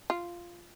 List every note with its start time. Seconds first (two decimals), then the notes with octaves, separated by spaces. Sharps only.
0.10 F4